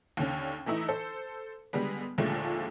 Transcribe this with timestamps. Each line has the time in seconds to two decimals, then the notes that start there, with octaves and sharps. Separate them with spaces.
0.17 D#2 D3 C#4
0.66 E3 A3 D#4 E4
0.88 A4 C5
1.73 D3 G3 G#3 B3
2.18 D#2 A#2 D3 F3 G#3 A3